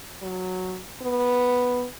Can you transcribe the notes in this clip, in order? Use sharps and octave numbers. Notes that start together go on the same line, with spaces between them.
F#3
B3